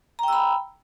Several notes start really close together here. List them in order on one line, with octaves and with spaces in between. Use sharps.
A#5 G5 E6 B5